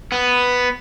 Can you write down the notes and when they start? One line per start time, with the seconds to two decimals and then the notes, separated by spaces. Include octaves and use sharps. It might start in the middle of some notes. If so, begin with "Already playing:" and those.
0.12 B3